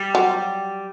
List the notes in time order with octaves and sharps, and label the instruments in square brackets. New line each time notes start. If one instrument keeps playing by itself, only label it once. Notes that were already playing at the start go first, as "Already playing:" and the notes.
Already playing: [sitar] G3
[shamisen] F#3